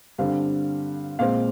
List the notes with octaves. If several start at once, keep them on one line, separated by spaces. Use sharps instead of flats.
G2 D3 G3 C4 F5
A#2 G#3 C4 F5